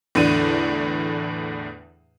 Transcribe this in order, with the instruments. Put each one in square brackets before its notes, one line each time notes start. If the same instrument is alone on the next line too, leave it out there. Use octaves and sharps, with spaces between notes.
[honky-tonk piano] E2 A2 D3 D4 D#7